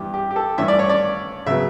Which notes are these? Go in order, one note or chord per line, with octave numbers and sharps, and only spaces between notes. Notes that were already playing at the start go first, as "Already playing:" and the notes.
Already playing: G2 E3 B3 E4 G4
G4
G4
A4
G2 E3 A3 C#4 E5
D5
C#5
D5
C#3 F#3 B3 E5